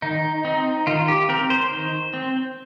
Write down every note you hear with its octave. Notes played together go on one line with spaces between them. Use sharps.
D#3 D#4
C4 D#4
D#3 F4
G4
C4 A#4
C5
D#3
C4